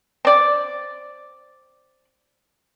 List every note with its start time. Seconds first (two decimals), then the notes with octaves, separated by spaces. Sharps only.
0.25 C4 D5